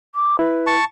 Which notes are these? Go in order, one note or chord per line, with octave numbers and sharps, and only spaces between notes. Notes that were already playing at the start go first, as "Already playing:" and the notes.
D6
E4 B4
A5 C#6